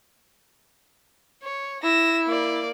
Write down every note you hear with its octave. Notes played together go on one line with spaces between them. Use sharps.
C#5
E4 A#6 E7
A#3 D5